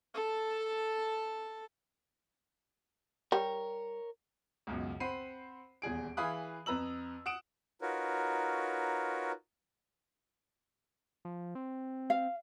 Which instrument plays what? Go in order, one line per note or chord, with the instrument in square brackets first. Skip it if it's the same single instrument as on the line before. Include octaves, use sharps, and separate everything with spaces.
[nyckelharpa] A4 A5
[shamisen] G3 [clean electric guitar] A#4 C#5
[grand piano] C#2 F#2 B2
C4 C5 F#5 B5 C7 D#7
D#1 E2 G#4 D7
E3 G#4 F5 B5 D#6 F#6
F2 B4 A#5 E6 F#7
F#5 D#6 D7 E7
[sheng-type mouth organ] D#4 F4 F#4 A#4 B4 C#5
[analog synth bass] F3
C4
[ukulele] F5